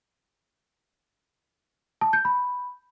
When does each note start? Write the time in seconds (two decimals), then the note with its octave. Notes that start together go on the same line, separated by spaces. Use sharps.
2.01 A5
2.13 G6
2.25 B5